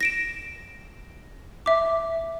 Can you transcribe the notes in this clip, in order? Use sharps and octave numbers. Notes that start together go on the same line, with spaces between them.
A#6 D7 E7
E5 D6